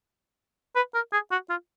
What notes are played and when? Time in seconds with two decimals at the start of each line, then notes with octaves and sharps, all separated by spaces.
0.76 B4
0.94 A#4
1.13 G#4
1.31 F#4
1.50 F4